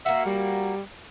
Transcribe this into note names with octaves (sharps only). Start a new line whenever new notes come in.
A#3 F#4 E5
G3